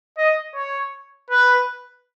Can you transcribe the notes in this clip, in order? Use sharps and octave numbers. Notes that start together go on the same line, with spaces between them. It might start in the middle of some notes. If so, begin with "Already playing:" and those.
D#5
C#5
B4